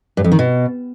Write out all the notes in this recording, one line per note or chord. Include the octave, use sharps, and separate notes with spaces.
G2
F2
D#3
B2